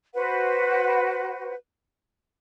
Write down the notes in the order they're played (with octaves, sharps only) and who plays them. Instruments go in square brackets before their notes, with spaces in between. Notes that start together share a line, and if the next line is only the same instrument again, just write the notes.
[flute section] F#4 B4 C5 F#5